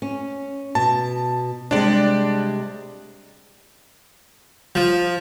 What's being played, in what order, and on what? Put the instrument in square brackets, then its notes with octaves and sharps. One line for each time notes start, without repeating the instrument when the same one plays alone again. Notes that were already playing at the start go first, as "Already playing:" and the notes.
[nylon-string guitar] C#4
[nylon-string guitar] B2 [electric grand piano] A5
[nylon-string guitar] C3 G3 G#3 [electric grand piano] D4 D5
[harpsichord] F3